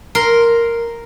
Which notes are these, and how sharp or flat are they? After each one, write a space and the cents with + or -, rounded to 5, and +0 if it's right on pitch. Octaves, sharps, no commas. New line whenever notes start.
A#4 +0 C6 +0